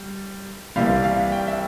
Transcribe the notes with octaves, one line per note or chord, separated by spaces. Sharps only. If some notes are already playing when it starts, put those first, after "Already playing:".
Already playing: G3
C2 C3 E3 G3 F5
F5
G5
E5